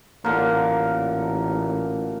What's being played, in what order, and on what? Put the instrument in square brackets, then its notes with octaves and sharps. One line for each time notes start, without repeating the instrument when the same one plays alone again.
[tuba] A1 [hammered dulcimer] A#2 D3 [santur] A#4 F#5